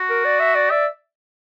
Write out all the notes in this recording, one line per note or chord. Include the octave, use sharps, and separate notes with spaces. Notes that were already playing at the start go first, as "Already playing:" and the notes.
Already playing: F#4
A#4
D5
E5
D5
D5 E5